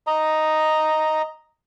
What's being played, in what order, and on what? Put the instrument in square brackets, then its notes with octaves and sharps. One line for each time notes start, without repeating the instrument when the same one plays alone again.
[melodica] D#5 A#5